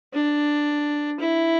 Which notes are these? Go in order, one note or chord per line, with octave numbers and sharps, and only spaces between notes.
D4
E4